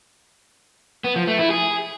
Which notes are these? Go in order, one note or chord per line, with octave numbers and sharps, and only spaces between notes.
B3
F3
A3
E4
G#4